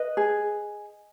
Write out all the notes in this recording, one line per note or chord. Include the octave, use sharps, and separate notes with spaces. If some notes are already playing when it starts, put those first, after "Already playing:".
Already playing: B4 D#5
G#4